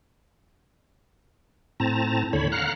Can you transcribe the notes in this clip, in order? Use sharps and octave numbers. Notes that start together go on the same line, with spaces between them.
A2 C4 A5 A#5
D#2 D3 C#5 B5
F5 F#5 A#5 F6 F#6